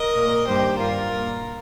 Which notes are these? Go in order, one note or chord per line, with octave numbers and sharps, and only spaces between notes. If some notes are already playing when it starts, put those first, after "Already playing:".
Already playing: A#4 D#5
A#2 A#3
G2 D#3 G3 A#3 G4 C5
G2 G3 A#3 F4 A#4
A#2 G3 A#3